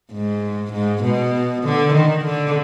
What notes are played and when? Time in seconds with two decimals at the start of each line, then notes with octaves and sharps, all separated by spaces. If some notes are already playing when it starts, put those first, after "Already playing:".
0.12 G#2
0.73 G#2
1.03 B2
1.64 D3
1.94 D#3
2.25 D3